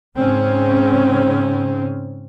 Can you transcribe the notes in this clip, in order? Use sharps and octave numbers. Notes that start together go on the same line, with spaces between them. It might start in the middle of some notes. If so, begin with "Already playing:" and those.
G#2 C#3 C4 C#4